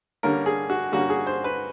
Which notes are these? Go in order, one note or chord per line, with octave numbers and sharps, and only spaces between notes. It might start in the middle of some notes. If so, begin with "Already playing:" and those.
D3 G3 A#3 C#4 A#4
G#4
F#4
D3 G3 A#3 C#4 F#4
G#4
C5
B4